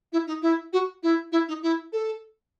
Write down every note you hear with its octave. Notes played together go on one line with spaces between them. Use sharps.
E4
D#4
E4
F#4
E4
E4
D#4
E4
A4